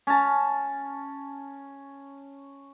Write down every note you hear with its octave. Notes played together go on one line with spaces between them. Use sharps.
C#4 A5